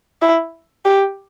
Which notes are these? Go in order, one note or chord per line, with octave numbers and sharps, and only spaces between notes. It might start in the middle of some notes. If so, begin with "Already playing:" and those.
E4
G4